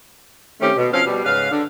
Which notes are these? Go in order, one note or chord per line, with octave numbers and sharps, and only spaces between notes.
D#3 A3 C4 C#4 G4
B2
F3 C4 C#4 F5
B2 G3
G#2 C#3 B4 F5
D3